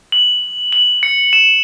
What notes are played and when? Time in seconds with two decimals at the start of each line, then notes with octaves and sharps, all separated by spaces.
0.12 F#7
0.72 F#7
1.03 C#7
1.33 E7